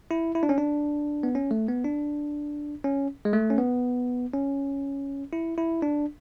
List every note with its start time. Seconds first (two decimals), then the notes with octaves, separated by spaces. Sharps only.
0.11 E4
0.35 E4
0.43 D4
0.49 C#4
0.58 D4
1.23 B3
1.35 C#4
1.51 A3
1.68 B3
1.85 D4
2.84 C#4
3.25 G#3
3.33 A3
3.50 C#4
3.58 B3
4.33 C#4
5.33 E4
5.58 E4
5.82 D4